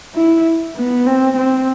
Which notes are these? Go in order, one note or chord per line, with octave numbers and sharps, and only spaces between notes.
E4
B3
C4
C4